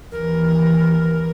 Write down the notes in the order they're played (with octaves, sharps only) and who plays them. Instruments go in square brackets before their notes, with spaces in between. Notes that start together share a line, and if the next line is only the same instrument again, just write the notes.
[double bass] D#2 E3 [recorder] A#4